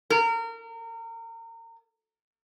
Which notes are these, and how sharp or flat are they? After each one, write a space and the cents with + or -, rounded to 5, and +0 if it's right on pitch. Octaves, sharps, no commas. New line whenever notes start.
A#4 -30